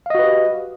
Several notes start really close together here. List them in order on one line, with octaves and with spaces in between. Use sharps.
F5 D#5 F#4 B4 G4